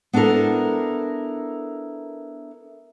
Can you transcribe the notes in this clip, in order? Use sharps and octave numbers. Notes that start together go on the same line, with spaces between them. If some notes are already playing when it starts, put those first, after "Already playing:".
B3 D4 E4 A4 A#4